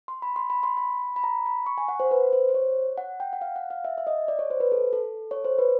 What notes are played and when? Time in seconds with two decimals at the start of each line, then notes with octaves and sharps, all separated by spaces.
0.08 C6
0.22 B5
0.36 C6
0.50 B5
0.63 C6
0.77 B5
1.16 B5
1.24 A#5
1.46 B5
1.66 C#6
1.78 G#5
1.88 F#5
2.00 C5
2.11 B4
2.33 C5
2.49 C5
2.54 C#5
2.98 F#5
3.20 G5
3.33 F#5
3.41 F5
3.56 F#5
3.70 F5
3.85 E5
3.98 E5
4.07 D#5
4.28 D5
4.39 C#5
4.50 C5
4.60 B4
4.72 A4
4.93 A4
5.31 C#5
5.44 C5
5.59 B4